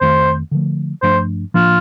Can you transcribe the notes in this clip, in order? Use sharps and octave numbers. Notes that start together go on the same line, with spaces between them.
F2 D#3 A3 C5
D3 F3 A3
G2 F3 A3 D4 C5
A2 F3 A#3 D4 F4